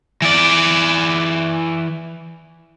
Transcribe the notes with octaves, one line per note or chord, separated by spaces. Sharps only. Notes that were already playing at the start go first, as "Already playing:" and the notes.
E3 D5